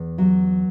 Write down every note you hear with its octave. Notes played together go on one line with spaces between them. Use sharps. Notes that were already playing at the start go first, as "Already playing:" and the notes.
Already playing: E2
F#3